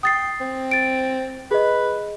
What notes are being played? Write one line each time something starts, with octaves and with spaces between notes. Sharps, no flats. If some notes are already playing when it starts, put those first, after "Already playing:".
G5 D#6 A6 C7
C4
A6 D7
G#4 B4 D#5